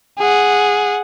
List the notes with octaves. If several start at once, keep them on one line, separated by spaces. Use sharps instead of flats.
G#4 F#5